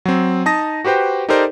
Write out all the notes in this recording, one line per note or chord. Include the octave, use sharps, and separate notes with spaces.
F#3 C4
D#4 A5 D#6 A#6
F#4 G4 B4 C5 G5
D#4 G4 A4 A#4 C5 D5